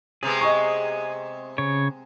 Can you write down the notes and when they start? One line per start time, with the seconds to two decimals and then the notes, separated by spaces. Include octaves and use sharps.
0.23 C3 G#3 B3 G#4
0.41 D#5 C#6
1.58 C#3 C#5